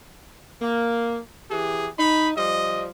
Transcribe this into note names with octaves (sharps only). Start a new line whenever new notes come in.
A#3
E3 G4 G#4
D#4 B5
F3 G3 D#5